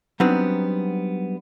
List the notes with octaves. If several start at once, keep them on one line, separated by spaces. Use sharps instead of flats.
F#3 G3 B3 C4 D4 D#4